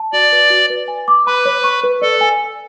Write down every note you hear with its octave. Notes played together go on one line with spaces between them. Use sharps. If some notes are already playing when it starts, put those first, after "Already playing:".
Already playing: A5
F#4 D5
B4
F#4
B4
G#5
D6
B4 B5
C#5
C#6
B4
A4 D5
G#5